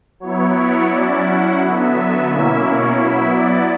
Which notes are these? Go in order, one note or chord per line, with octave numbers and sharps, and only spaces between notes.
F#3 B3 E4 C#5
C#5
F#3 C#4 E4 D5
F#5
D3 F#3 B3 E5
B2 A#3 C#4 E4 E5
C#5
F#3 B3 E4 E5
D5